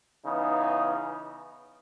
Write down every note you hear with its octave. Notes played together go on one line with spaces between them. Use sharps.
C#3 E3 B3 D#4